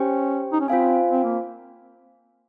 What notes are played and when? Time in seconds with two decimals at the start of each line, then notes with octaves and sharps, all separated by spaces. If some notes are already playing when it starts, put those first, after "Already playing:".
Already playing: C#4 G4 C5 G5
0.52 D#4
0.61 C#4
0.68 C4 F4 C5 F5 G#5
1.11 C4
1.24 A#3